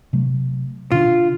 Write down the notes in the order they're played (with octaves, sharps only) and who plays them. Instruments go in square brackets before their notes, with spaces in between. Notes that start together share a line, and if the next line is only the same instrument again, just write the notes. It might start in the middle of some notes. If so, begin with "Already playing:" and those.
[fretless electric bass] C3 F#3 A3
[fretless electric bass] B2 D3 D4 [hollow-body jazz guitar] F4